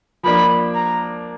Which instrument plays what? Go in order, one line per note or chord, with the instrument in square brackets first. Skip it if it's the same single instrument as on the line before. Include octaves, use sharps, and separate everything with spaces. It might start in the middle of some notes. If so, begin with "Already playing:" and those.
[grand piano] F3 A#3 D4 [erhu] B5
[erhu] A#5